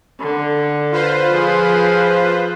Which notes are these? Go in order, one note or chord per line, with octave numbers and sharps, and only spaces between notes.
D3
F4 B4 C5
F3 G#4